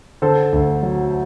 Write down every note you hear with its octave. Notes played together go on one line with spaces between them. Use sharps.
D3 A4 C5
D2
F#3